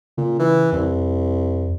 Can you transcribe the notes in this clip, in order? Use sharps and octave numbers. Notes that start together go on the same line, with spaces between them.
A#2 C#3
E3
C2 F2